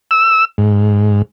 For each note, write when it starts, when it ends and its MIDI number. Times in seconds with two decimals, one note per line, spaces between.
0.11 0.45 88
0.58 1.22 44